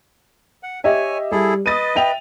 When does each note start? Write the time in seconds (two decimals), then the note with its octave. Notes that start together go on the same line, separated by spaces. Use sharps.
0.63 F#5
0.84 G4 C#5 D#5 E5 G#5
1.32 G3 E4 G#4 A4
1.66 B4 D#5 D#6 A6 D#7
1.95 E5 G5 F7